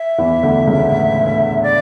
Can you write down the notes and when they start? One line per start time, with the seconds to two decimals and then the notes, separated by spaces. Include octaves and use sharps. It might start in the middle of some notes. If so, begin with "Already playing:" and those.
Already playing: E5
0.18 E2 E3
0.43 D2 D3
0.67 C#2 C#3
0.91 A2
1.26 A2
1.63 D5